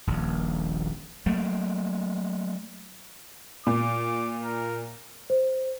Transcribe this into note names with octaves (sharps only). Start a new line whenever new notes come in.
D#1 A#1
F#3 A3 A#3
A#2 D6
A#4
C5